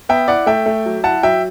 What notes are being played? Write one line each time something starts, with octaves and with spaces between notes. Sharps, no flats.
B3 E5 G5
E4 D5 F#5
A3 E5 G5
A3
F#3
E4 F#5 A5
F#3 E5 G5